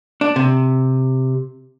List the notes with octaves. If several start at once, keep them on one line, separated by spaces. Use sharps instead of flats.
D4
C3